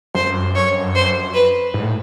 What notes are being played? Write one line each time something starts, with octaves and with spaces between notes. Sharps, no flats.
F#2 C5
C#5
C5
B4
G#2
A2